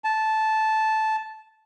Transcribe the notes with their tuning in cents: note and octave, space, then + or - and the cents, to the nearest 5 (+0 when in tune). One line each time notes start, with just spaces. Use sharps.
A5 -10